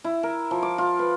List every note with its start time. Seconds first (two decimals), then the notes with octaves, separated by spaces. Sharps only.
0.04 E4
0.23 A#4
0.51 F3
0.63 D6
0.78 F4
0.99 B4